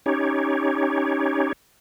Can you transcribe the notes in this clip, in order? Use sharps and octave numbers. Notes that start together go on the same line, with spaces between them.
C#4 D#4 G4 C#5